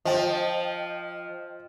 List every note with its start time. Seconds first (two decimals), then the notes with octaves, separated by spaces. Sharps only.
0.05 F3 D#5 G5